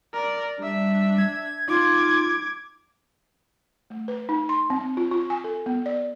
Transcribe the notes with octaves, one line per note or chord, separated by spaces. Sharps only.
A#4 D5
G3 D4 E5
G#6
D#4 F4 D6 G#6
A3
B4
D#4
C6
C4
F4
F4
G#5
A4
B3
D5